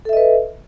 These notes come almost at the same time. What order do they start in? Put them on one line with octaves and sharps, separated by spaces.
A4 E5 D#5 B4